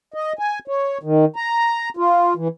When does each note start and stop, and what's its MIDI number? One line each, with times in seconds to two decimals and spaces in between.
0.14 0.33 75
0.39 0.59 80
0.68 0.98 73
1.03 1.25 51
1.36 1.89 82
1.97 2.33 65
2.36 2.48 52